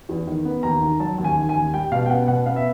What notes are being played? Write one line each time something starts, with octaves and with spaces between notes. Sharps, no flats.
E2
D#3
B3
D#2 A#5
D#3
F#3 A5
D#2
G#5
D#3
G#5
D#2
G3 G5
B2 F5
G5
B3 F#5
B2 F#5
B3 F5
E5